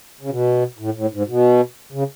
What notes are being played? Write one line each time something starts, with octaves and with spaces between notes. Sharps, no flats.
C#3
B2
A2
A2
G#2
B2
C#3